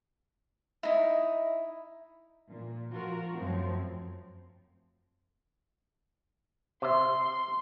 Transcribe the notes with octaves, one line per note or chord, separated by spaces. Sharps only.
D#4 E4
A#2
F3 F4 F#4 A#4
F#2 F3 A3 C4
C3 E5 C6